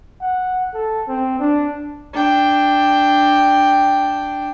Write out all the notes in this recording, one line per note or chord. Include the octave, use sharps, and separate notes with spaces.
F#5
A4
C4
D4
D4 G5